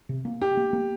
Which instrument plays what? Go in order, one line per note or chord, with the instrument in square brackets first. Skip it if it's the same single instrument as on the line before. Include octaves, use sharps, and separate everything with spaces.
[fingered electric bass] C3
A#3
[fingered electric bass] D4 [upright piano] G4
[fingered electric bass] A#3
A#3